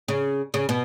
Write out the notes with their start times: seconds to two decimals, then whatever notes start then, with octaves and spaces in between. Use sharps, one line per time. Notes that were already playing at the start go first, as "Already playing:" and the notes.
0.08 C#3
0.54 C#3
0.69 B2